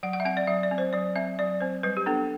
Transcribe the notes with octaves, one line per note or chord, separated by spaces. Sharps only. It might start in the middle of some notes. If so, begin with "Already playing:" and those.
F#3 F#5
F#5
E5
C4 F#5
D5
F#3 E5
D5
C4
C5
F#3 D5
C4 E5
F#3 D5
C4 C5
G3 B4
G4
B3 D4 A4